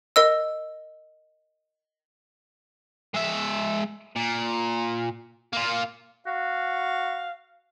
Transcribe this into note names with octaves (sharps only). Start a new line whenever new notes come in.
A#4 D#5 E6
G#3 E5
A#2
A#3 F4
F#4 F5